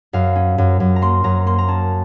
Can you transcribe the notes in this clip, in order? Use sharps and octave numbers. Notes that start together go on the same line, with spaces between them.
F#2 F5
C#4
F#2
F#2
A#5
A#3 C6
F#2 A#5
A#3 C6
A#5
C#4 A5